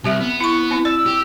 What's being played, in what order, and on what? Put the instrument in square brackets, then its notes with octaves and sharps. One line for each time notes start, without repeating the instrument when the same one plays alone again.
[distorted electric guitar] C2 [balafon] C4 G4 E5
[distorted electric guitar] B3
[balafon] E4 C#6
C4 E4
[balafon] D5 [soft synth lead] E6
[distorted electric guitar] G4